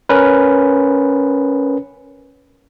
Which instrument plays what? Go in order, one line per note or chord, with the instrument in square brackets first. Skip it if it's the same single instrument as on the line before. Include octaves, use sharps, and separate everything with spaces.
[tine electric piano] C#4 A#4 B4